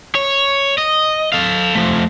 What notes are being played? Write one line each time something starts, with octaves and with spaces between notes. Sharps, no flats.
C#5
D#5
A4 F5
F3 A3